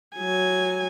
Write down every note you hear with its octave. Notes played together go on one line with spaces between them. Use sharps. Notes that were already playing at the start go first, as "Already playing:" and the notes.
F#3 G#5